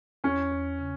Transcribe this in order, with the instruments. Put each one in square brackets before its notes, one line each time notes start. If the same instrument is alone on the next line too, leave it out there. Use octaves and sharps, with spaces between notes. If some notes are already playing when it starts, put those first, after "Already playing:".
[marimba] E2 [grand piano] C#4
[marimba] E2
C#3